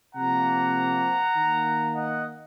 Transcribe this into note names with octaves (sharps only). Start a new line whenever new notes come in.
C3 F3 A#3 F#5 A#5
D#3 A#3
D#5 F#5